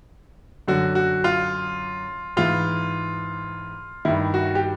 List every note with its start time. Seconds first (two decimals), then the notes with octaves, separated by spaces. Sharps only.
0.68 F#2 D3 F#4
0.95 F#4
1.24 F4
2.36 G#2 E3 F4
4.05 G2 D#3 E4
4.34 F#4
4.55 G4